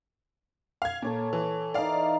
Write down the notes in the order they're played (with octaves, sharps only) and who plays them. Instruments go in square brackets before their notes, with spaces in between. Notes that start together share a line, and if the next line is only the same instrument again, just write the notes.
[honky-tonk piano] F5 G#6
[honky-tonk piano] A#2 [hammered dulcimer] A4 C#5 A#5
[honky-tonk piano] E3
[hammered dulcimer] E3 D#4 [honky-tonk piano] D5 F5